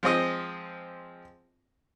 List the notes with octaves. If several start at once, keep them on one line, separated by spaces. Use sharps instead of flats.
F3 G#3 C4 D#5